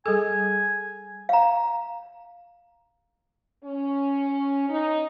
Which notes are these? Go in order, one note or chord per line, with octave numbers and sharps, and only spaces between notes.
G3 G#4 A4 G#5
F5 A#5
C#4
D#4